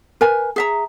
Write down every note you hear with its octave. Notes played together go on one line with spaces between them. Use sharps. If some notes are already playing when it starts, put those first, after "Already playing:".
A#4 B4 G#5
G#4 E5 A#5